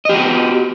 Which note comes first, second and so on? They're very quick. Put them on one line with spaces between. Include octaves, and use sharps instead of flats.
D#5 G4 F#4 B3